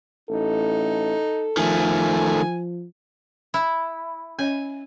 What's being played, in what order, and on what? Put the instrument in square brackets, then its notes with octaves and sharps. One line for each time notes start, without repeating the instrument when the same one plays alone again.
[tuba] A1 [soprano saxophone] D#4 [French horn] A4
[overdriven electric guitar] D#3 A3 [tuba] F3 [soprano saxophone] G#5
[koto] E4
[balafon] C#4 C#5 D#5 [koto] G#5